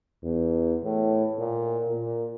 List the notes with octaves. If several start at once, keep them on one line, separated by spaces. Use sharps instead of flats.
E2
A2
A#2
A#2